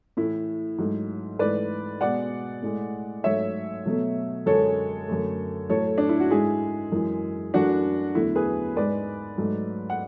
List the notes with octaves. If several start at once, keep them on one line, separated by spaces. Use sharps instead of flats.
A2 E3 A3 E4
G#2 F#3 A3
G#2 E3 A3 B4 D5
B2 G#3 D5 F#5
A2 G#3
G#2 F#3 A3 C#5 E5
B2 F#3 A3
F#2 D3 G#3 A4 C#5
F#2 D3 A3
A2 F#3 A3 A4 C#5
D4
E4
F#4
G#2 G#3 E4 G#4
F#2 E3 G#3
F#2 E3 A3 D4 F#4
E2 D3 F#3 A3 E4
G#4 B4
G#2 G#3 B4 D5
G#2 F#3 A3
F#5